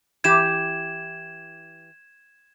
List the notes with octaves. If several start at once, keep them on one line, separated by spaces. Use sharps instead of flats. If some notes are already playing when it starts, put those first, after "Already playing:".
E3 G4 G#6 E7